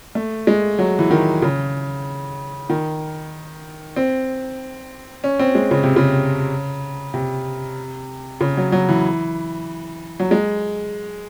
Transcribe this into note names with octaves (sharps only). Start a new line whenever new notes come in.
A3
G#3
F#3
E3
D#3
C#3
D#3
C4
C#4
C4
G#3
C#3
C3
C#3
C3
C#3
F#3
F#3
E3
F#3
G#3